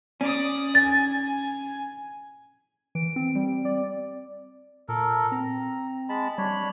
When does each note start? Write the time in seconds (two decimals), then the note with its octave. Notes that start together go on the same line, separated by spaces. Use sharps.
0.21 C#4 D5 D#6
0.75 G#5 A6
2.95 E3 D7
3.16 C4
3.35 G3
3.65 D5
4.89 A#2 A4 A#4
5.32 C4 A#5
6.09 G#3 A5 B5
6.38 G3 D4 C#5 B5